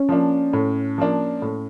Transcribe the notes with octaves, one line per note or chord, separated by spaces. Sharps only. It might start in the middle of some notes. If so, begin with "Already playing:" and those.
Already playing: C#4
F3 A#3 D4
A2
F3 A#3 D4
A2